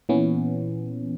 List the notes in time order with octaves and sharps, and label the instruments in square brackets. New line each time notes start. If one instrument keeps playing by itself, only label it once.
[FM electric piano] A#2 E3 B3 C#4